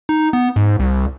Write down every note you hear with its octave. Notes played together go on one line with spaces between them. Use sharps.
D#4
B3
G#2
C2